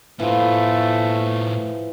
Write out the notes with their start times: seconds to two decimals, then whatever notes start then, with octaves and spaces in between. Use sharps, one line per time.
0.20 A2 E3 F3 A3 F4